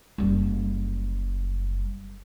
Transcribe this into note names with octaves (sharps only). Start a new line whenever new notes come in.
F#1 G3